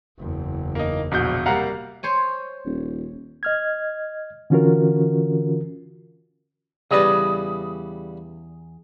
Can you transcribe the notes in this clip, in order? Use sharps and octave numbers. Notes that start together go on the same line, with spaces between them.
F#1 E2
A#3 D#4
E1 A#1 B2 F#4 G6
C3 G3 A#3 F5 F#5 A#5
C5 C#5 G#5
D#1
D#5 F6 G#6
D3 E3 C#4 F4 F#4 A#4
E2 C#3 G3 B4 D#5